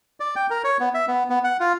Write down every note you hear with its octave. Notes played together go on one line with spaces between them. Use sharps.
D5
G5
A#4
C#5
B3
E5
B3
B3
F#5
F4